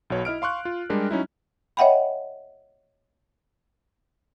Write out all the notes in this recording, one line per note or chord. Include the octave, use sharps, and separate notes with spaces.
B1 B2 C#5
E4 D#5 F6 D7
F5 C6 C#6 F#6
F4
G3 G#3 D4 G4 A#4
F#3 C#4 D#4 E4
C#5 D#5 E5 F#5 G5 B5